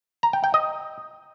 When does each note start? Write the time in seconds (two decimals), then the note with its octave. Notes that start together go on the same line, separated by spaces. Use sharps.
0.23 A#5
0.33 G5
0.44 G5
0.54 D#5